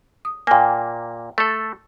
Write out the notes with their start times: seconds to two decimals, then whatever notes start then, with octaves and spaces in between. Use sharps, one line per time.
0.25 D#6
0.47 A#2 A#3 G5 G#5
1.38 A3 A4